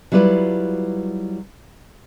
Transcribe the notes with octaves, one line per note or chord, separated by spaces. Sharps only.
F#3 G3 E4 F4 B4